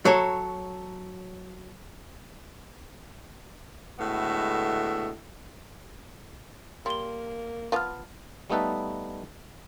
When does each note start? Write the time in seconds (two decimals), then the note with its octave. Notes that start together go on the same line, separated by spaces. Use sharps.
0.05 F#3 A4 C#5
3.99 A2 D3 G#3 B3 F#4 E5
6.86 G3 A#3 C6 G7
7.72 F3 B3 F4 A5 F6
8.50 G3 A3 B3 D#4 A4 B4